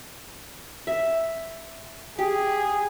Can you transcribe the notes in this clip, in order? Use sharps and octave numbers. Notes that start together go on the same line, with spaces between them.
E5
G4 G#4